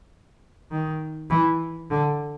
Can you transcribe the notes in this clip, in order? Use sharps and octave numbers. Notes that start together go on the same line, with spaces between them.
D#3
E3
D3